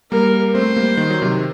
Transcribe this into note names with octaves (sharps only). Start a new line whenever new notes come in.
G3 A#3 A#4
A3 C4 C5
G3 A#3
D#3
F#3
C3 D#3